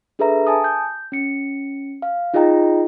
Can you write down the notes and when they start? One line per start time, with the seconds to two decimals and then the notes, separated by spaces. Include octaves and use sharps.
0.19 D4 G#4 A4 B4 E5 A#5
0.47 G#5 A5 D#6
0.64 G6
1.12 C#4 C#7
2.02 F5
2.34 D#4 F4 G#4 D#5 G5 A#5